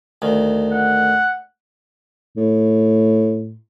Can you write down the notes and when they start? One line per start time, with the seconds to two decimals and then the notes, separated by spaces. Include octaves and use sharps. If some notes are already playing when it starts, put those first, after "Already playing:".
0.22 D2 D#3
0.72 F#5
2.37 A2